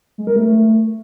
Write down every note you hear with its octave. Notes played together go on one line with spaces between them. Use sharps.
G#3
A#4
A3